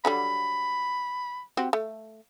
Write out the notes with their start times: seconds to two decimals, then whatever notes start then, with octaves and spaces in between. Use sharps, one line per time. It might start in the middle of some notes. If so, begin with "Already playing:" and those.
0.05 D3 F#3 G3 B5
1.57 C4 F#4 G4
1.73 A3